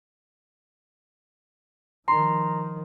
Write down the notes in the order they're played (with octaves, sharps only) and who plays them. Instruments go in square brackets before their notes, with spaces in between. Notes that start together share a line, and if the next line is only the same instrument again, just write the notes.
[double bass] D#3 F3 [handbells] A#5 [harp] C6